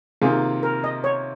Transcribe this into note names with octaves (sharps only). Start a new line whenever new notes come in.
C3 D#3 A#3 F4 G#4
A#4
D#5
C#5